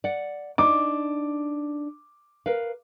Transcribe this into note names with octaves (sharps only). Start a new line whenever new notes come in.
D5 F#5
D4 D#4 D6
A#4 B4 F5